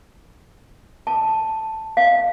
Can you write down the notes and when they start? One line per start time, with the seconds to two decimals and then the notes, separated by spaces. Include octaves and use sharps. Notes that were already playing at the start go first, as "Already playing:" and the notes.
1.07 A5
1.97 F5